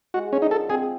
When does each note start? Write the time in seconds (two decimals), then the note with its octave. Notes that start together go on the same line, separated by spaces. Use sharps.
0.14 G#3 F#4
0.33 D3 C#4
0.42 D#4
0.51 F3 A4
0.70 C4 G#4